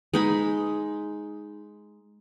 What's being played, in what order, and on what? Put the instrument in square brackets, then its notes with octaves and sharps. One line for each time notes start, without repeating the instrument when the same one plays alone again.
[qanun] G#3 D#4 B5